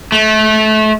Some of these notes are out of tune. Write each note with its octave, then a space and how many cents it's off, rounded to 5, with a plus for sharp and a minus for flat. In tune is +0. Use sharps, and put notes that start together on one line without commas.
A3 -25